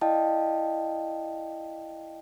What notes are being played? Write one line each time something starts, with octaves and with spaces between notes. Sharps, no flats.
E4 D5 D#5 F5 G5 A5